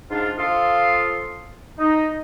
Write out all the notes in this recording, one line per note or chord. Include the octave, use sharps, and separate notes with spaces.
G#2 D4 F4
F3 F4 A4 F5 C6 D#6
D#4